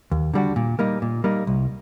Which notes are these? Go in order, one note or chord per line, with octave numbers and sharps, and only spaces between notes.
D#2
D3 G3 D4 F#4
A#2
G3 A#3 D#4
A#2
G3 A#3 D#4
C2